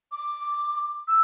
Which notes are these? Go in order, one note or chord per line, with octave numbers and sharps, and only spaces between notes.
D6
E6